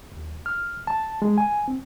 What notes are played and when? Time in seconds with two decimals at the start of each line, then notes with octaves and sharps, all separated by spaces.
0.12 D#2
0.46 F6
0.87 A5
1.22 G#3
1.38 G#5
1.68 C4